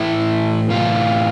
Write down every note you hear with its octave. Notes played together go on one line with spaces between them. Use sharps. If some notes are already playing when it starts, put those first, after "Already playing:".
Already playing: A2 E3 E4
A2 E3 F4